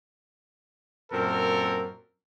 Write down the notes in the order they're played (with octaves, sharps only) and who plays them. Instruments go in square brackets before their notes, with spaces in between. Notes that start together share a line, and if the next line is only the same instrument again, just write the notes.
[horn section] F#2 A#2 C4 A4 A#4